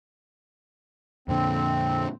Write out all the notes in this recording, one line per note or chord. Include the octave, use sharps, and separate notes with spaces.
F2 A#2 D3 C4